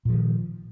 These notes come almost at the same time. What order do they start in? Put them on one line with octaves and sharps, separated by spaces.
A#2 F3 D#3